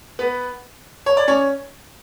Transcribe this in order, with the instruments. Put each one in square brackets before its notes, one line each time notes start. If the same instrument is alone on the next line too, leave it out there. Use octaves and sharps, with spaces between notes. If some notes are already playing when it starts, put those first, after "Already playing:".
[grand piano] B3 B4
C#5
D5
C#4 C#5